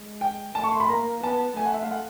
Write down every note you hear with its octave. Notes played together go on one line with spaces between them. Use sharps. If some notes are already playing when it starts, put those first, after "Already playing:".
Already playing: G#3
G5
A3 A5
C#6
C6
B5
A#3 A#5
B3 A5
A3 G#5
F#5
E5
F5
F#5